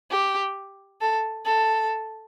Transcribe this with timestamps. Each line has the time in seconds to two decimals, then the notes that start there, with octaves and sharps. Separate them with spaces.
0.11 G4
1.01 A4
1.46 A4